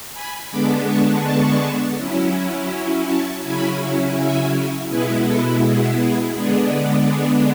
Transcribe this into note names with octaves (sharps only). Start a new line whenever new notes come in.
G#5 B5
D3 G#3 B3 D4 B5 D6
A5 C#6
A5 C#6
F#3 C#4 E4
A5 C#6
C#3 F#3 C#4 E4 G#5 B5
E5 G#5
B2 G#3 B3 E4 G#4 B4
F#4 A4
G#4
G#4
D3 G#3 B3 D4 G#4
G#4